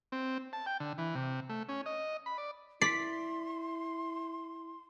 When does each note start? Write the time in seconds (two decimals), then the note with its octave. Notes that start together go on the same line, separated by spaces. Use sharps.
0.12 C4
0.53 A5
0.66 G5
0.80 D3
0.98 E3
1.15 C3
1.49 A3
1.69 C#4
1.86 D#5
2.26 B5
2.38 D5
2.82 E4 D5 C6 B6